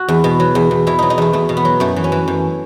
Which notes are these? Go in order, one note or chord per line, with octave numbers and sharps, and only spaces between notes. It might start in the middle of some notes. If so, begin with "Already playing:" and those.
Already playing: F#4
E2
B2
F#3
E2
E2
B2 E4
F#3 D#4
D#4
E2 A3
E2 A3
B2
B3
F#3
F#2 A3
E3
C#4
E3
F#2